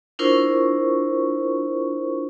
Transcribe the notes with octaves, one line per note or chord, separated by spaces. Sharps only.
D4 E4 F4 A#4 C5 C#6